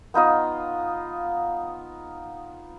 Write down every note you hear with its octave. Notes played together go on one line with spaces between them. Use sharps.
B3 D#4 F4 D#5